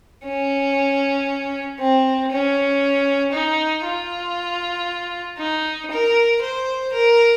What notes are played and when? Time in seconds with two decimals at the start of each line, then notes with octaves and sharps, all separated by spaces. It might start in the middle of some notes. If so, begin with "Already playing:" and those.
0.25 C#4
1.79 C4
2.31 C#4
3.33 D#4
3.85 F4
5.38 D#4
5.90 A#4
6.42 C5
6.92 A#4